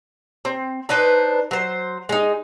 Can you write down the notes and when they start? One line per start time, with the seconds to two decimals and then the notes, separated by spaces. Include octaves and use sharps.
0.45 C4
0.89 D4 D#4 B4 C5
1.51 F#3 C5
2.09 G#3 D#4